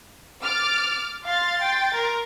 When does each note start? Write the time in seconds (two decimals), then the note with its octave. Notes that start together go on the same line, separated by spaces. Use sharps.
0.44 D6 F6 A6
1.26 F5 C6 A6
1.61 G5
1.94 A#4